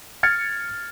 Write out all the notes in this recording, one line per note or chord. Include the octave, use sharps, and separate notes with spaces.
F6 G#6 A6 C#7